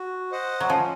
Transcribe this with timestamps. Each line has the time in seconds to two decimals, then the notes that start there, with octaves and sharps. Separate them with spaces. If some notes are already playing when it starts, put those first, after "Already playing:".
Already playing: F#4
0.31 C5 D#5 F#5
0.60 F#3
0.70 F3 C#4